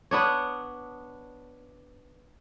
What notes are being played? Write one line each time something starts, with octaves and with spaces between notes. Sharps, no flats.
B3 D4 C#5